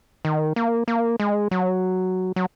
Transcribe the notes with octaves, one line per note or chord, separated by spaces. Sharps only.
D#3
A#3
A#3
G#3
F#3
F#3